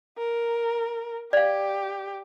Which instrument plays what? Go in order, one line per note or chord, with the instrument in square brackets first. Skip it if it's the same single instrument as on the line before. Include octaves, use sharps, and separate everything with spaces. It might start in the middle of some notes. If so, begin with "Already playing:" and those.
[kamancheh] A#4
[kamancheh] G4 [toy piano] D5 F5